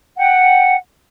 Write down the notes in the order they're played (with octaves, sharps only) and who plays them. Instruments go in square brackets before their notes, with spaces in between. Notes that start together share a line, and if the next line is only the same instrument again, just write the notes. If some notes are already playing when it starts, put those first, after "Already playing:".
[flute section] F#5 G5